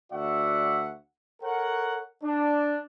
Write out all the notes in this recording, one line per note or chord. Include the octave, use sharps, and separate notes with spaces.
D2 F#4 D5 E5 F#5
A4 A#4 C#5 F#5
D4